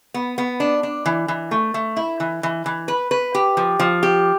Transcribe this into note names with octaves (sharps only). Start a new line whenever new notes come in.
B3
B3
D4
D4
E3
E3
A3
A3
E4
E3
E3
E3
B4
B4
G4
F3
F3
G4